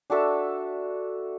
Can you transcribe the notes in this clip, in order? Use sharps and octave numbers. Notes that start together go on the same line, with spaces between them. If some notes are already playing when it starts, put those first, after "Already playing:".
D4 F#4 A4 E5